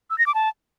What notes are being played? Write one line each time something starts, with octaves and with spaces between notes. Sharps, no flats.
E6
A#6
D6
A5